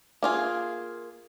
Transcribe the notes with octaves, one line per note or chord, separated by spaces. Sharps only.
A#3 F4 G#4